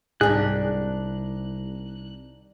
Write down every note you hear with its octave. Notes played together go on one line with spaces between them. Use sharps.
C2 G#2 D#3 D4 G4 G#4 F#6